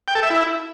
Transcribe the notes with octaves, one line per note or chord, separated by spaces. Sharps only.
G5
A4
E5
E4